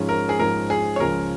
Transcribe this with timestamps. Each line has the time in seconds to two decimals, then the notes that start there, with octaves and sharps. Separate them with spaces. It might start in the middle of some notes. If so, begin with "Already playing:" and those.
Already playing: G#2 F3 G#3 C#4
0.09 A#4
0.29 G#4
0.39 G#2 F3 G#3 C#4 A#4
0.70 G#4
0.96 C#5
1.00 C#2 C#3 F3 G#3 C#4 A#4